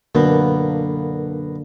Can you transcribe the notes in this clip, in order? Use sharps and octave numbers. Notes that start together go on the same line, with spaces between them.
F#2 B2 D3 A#3 B3 D4